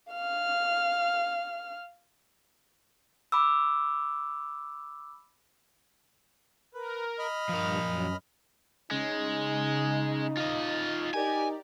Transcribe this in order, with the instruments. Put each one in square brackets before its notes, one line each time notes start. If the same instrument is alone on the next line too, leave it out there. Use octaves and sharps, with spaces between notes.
[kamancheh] F5 F6
[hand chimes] B5 D6 E6
[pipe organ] A#4 [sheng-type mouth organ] B4
[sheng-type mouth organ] D#5 B5 F6
[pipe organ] G2 [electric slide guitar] F3 A#4
[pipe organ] F#2
[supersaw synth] C#3 [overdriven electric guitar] G#3 [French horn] D#4
[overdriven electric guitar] F4 D#5
[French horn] D#4 [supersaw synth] G4 A#4 D5 [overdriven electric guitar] G#5